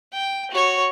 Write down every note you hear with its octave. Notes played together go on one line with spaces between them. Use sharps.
G5
F#4 C#5